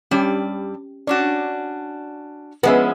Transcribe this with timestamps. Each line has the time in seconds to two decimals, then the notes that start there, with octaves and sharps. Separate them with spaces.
0.11 G2 G3 C#4 G4 D5
1.07 C#4 D4 F#4 D5
2.63 F3 G#3 B3 C#4 G#4 D#5 E5